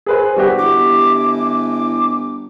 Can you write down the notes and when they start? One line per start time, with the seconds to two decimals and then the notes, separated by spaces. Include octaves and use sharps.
0.06 G#4 B4 C5
0.36 G1 G3 F#4 G4
0.58 G1 E4 D6